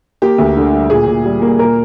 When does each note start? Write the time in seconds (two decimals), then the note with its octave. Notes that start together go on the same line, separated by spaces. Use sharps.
0.22 A#3 G4
0.38 D2
0.57 D3
0.73 G3
0.90 A#2 G#4
1.07 A#2
1.25 G3
1.42 A#3
1.59 A#2 A#4